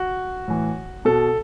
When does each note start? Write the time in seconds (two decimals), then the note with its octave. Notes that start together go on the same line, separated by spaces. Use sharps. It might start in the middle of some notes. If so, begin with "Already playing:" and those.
Already playing: F#4
0.48 A2 E3
1.05 B2 A4